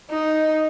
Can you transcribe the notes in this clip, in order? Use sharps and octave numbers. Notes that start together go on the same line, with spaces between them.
D#4